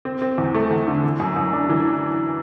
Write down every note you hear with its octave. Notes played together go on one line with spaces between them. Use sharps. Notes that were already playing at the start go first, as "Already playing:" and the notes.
C4
C4
E2
A3
E2
D3
E3
F#2
F#2
D4
E3